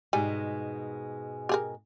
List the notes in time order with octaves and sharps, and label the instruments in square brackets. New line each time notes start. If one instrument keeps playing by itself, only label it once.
[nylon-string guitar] G#2 B2 G#3 [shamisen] G3 G#5
[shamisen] G4 G#4 A#4